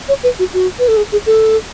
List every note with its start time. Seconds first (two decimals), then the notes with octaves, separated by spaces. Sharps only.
0.09 C#5
0.23 B4
0.39 F#4
0.54 F#4
0.79 B4
0.88 A4
0.97 G#4
1.12 G#4
1.26 A4